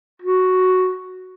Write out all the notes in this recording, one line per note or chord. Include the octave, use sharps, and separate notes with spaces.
F#4